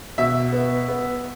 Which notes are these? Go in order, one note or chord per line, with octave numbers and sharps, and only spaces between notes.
B2 E5
B3
B3